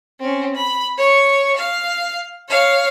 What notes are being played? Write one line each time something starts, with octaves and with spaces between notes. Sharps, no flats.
C4 C#4
B5
C#5 C#6
F5
C#5 F5